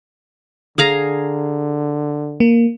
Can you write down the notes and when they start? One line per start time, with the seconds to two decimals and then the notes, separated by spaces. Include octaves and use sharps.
0.78 D3 G#4 F5 A#5
2.40 A#3